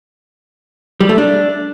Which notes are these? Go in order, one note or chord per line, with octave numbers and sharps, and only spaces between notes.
G3
A3
D4